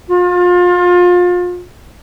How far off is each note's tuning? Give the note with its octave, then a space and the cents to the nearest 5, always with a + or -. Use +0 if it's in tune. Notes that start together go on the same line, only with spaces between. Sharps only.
F4 +30